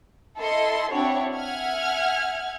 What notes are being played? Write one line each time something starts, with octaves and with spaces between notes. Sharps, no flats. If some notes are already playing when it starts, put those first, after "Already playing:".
E4 A4 D#5 C6
C4 D4 E4 F#4 C#5
E5 F#5 G#5 F6 G#6